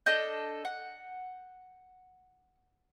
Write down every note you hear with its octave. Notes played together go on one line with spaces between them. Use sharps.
D4 A4 D#5 G6
F#5